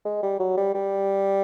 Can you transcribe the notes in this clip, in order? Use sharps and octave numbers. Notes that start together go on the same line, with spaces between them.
G#3
G3
F#3
G3
G3